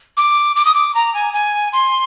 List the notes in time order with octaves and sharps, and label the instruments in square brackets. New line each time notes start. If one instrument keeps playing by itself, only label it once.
[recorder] D6
D6
D#6
D6
A#5
G#5
G#5
C6